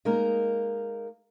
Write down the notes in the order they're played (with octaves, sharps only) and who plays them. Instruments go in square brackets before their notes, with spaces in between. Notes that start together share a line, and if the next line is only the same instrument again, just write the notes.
[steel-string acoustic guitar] G#3 A#3 D#4 A#4